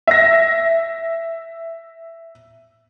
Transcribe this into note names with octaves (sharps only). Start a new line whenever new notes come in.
E5 A#6